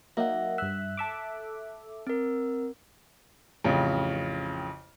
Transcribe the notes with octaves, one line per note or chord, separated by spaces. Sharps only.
F#3 A#3 D#4 E5 F#5
G2 E5 F#6
A4 E5 D6
C4 A#4
A1 F2 C#3